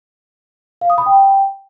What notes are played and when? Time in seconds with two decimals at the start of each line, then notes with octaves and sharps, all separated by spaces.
0.81 F5
0.90 D#6
0.98 B5
1.06 G5